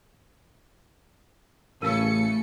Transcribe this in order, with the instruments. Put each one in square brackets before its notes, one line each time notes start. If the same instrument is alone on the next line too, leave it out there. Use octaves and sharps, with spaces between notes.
[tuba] A1 [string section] C#3 A4 C#7 [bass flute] A3 [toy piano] A#4 F5 E6